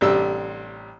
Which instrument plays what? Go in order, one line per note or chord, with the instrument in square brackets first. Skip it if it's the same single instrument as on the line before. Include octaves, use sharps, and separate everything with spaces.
[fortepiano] A1 C3 G3 D4 E6